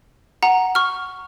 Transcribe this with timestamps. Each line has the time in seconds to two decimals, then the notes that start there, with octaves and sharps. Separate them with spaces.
0.43 F#5 A#5
0.75 C#6 F6